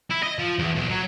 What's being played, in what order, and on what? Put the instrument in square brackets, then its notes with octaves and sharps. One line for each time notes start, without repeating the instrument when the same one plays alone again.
[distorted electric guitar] E4
D#5
F3
E2
B1
F#3